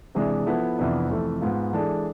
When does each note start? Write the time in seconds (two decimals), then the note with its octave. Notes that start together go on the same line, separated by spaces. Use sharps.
0.15 C3 E3 G#3 D4
0.46 F3 B3 E4 A4
0.78 F2 C3 E3 B3 D4
1.09 F2 C3 E3 A3
1.41 G#2 G#3 B3 F4
1.73 E3 G#3 D4 A4